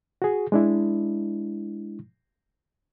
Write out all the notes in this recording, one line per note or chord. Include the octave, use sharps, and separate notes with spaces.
F#4 G#4
G#3 D4 E4